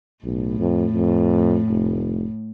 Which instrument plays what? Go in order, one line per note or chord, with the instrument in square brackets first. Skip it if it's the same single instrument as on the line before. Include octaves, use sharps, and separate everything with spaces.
[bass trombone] B1 [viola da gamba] A2
[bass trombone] F2
F2
F1